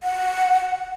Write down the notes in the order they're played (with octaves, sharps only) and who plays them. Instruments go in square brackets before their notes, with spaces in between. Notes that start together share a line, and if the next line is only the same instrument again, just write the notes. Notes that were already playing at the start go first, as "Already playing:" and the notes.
[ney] F#5